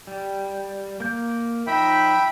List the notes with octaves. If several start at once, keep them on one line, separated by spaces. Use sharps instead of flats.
G3
A#3 G6
F3 D#4 E5 G5 B5